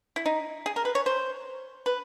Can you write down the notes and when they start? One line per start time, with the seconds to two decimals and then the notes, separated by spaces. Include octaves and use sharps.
0.16 E4
0.26 D#4
0.66 G#4
0.76 A#4
0.85 B4
0.95 C#5
1.06 C5
1.86 B4